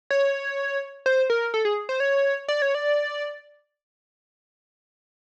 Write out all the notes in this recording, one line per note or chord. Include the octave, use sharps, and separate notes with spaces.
C#5
C5
A#4
A4
G#4
C5
C#5
D5
C#5
D5